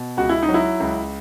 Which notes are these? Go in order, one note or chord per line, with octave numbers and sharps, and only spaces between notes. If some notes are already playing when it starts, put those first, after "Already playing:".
Already playing: B2
C#2 F#4
E4
D#4
F#3
E4
C#2